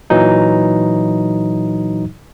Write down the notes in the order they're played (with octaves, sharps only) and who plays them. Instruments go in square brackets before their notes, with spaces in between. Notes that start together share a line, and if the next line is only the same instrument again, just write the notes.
[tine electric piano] A#2 E3 F#3 D#4